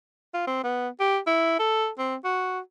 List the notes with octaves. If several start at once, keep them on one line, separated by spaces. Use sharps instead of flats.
F4
C4
B3
G4
E4
A4
C4
F#4